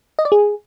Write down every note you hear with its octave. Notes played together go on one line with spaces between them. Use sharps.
D#5
D5
G#4